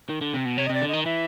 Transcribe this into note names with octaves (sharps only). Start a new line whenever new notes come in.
D#3
D3
C3
B2
C3 C#5
D#5
C3 D5
D3
D#3 D#5
E3 E5